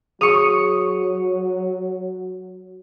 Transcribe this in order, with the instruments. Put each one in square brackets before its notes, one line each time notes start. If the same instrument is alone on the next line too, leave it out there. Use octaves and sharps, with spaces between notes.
[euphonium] F#3 [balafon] G#4 [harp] C#6 D#6